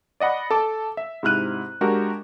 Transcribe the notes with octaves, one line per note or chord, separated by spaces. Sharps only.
D5 D#5 F#5 B5
A4 A5 D6
E5
G#2 C3 E4 F6 F#6 D#7
G#3 D4 F#4 G4 A#4